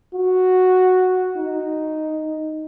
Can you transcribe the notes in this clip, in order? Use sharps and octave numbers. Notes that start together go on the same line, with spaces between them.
F#4
D#4